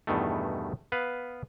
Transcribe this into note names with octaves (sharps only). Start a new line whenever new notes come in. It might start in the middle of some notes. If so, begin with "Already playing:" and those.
E2 G2 B2 D#3 A3
B3 B4 F5